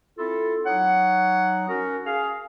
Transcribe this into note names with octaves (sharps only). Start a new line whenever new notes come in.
C4 E4 F4 A4
F#3 D#4 C#5 F#5
C#4 F#4 A#4
G#4 F5